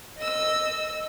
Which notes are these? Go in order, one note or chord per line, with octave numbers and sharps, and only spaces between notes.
D#5 E6